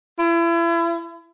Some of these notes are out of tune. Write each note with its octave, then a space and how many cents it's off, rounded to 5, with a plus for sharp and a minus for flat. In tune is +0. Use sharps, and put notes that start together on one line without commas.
E4 +35